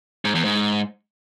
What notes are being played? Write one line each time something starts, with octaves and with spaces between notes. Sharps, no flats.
G#2
E2
G#2